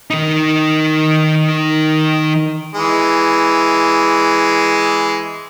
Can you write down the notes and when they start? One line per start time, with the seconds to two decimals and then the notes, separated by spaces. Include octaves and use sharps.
0.10 D#3 D#4
2.75 E3 G#3